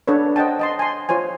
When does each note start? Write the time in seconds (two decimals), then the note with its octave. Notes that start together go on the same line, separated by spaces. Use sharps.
0.07 D4 A4 B4 C#5
0.36 C5 D#5 F#5 G5 A5
0.59 D#5 A5 C6
0.79 G#5 C6
1.09 F4 C5 C#5 G#5